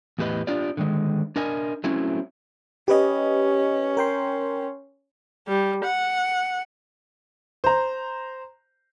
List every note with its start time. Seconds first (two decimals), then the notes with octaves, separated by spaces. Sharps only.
0.18 E2 A2 G4 B4 D#5
0.47 D4 F4 G4 D5
0.77 D3 D#3 G#3
1.36 D4 A#4 D#5 G#5
1.84 F#3 A3 C4 C#4 E4
2.88 C#4 G4 B4 D#5
3.97 A#4 G5 C6
5.48 G3
5.85 F#5
7.64 C5 A#5